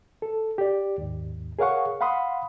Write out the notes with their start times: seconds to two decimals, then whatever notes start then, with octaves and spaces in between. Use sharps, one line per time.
0.22 A4
0.58 G4 D5
0.98 D#2 G#2
1.59 G#4 A#4 C#5 F5 F#5 C#6
2.01 F5 F#5 B5 C6 D#6